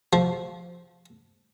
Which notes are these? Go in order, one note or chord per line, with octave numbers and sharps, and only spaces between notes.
F3